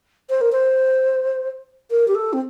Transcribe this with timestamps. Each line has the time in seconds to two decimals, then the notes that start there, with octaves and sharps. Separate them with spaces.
0.30 C5
0.41 A#4
0.52 C5
1.91 A#4
2.08 G4
2.15 A4
2.33 C4